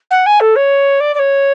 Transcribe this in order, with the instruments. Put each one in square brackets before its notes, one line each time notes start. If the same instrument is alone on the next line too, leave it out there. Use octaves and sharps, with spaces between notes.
[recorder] F#5
G#5
A4
C#5
D5
D5
C#5